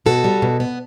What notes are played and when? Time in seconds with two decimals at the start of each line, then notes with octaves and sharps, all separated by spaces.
0.06 B2 F#4 A4
0.24 G3
0.42 B2
0.60 B3